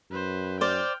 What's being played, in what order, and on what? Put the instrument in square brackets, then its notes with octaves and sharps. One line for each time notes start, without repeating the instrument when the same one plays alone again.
[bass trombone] F#2 [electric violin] B4 C5
[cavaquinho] C5 D5 [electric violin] G5 F6